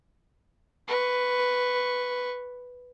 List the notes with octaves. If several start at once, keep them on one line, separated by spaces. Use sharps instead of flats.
B4 C#6